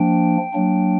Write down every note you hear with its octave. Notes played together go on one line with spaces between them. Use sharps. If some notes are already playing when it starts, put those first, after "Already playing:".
Already playing: F3 A#3 D4 G5
F#3 A#3 D4